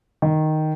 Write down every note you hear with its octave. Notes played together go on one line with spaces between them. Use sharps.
D#3